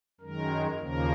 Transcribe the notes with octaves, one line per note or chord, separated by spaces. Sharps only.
F#2 D#3 G#3 A#4
D#2 C#3 F3 A#3 A#4